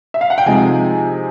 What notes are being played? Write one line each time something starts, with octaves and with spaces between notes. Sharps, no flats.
E5
F5
F#5
G5
C3 F3 G#3 C4 D#4 G#5